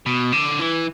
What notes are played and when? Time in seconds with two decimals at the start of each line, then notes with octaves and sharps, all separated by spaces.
0.06 B2
0.33 D3
0.60 E3